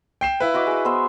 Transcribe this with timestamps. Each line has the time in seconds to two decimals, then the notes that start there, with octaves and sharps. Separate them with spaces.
0.21 G5 C7 E7
0.40 E4 B4 F5
0.54 F#4 D#5 D6
0.67 G#4 D#6
0.85 B3 C5 E5